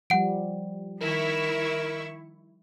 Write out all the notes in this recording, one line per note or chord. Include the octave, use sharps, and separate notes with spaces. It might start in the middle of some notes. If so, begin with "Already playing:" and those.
F3 G3 F#5 D7
D#3 E4 A#4 C#6